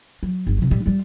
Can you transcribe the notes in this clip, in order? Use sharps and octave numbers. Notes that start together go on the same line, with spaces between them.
F#3
G1
C3 F#3
A#2 G3
G3 F4